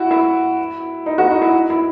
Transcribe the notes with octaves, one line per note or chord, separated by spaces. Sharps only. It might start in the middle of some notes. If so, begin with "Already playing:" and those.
Already playing: E4 F#4
E4
D#4
F#4
D#4
E4
E4